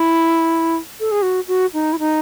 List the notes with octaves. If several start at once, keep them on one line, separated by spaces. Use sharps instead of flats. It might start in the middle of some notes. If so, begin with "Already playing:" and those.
Already playing: E4
A4
G#4
F#4
F#4
D#4
E4
D#4